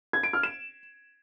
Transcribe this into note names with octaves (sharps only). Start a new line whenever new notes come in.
G#6
D7
F6
E7